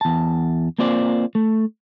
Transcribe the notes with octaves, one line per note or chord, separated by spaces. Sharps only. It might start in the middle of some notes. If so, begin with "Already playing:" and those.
E2 A5
A#3 C4 F4 C5 D5
A3